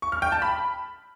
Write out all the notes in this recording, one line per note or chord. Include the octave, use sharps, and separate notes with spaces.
C#6
F6
G5
A5
B5